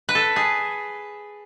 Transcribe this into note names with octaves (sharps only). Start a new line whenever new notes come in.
B4
A4
G#4